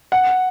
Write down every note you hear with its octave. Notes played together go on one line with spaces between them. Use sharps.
F#5